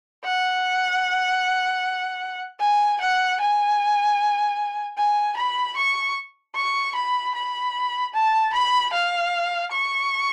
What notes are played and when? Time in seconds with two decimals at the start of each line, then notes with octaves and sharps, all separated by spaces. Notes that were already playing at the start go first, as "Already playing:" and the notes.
0.24 F#5
2.60 G#5
3.01 F#5
3.40 G#5
4.97 G#5
5.36 B5
5.77 C#6
6.55 C#6
6.95 B5
7.35 B5
8.14 A5
8.53 B5
8.93 F5
9.71 C#6